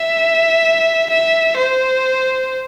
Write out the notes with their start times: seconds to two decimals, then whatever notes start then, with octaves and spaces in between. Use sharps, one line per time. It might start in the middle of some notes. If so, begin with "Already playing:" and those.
Already playing: E5
1.10 E5
1.56 C5